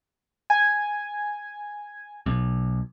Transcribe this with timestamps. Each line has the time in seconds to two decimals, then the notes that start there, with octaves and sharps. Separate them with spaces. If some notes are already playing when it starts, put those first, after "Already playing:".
0.50 G#5
2.26 B1